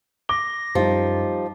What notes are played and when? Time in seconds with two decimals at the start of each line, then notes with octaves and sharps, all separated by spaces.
0.29 D6 A#6 G7
0.75 F#2 F3 G3 D#4